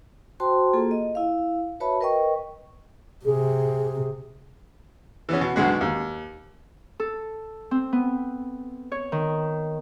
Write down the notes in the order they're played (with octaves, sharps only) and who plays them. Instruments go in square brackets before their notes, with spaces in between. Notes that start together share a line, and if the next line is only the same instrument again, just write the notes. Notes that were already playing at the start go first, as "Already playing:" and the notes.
[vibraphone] F#4 C5 G5 A5 C6
A#3 F4 G#4 A4
D#5
E4 F5
F#4 B4 C#5 E5 A5 B5
A#4 B4 D#5 G5 C#6
[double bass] C3 [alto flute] G#4
[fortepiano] E3 B3 C#4
B2
B1 D3 G#3 F#4
D#2
[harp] A4
C4
B3
C#5
D#3